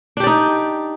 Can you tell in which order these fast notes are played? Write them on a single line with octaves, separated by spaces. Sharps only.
D4 G4 D5 D#4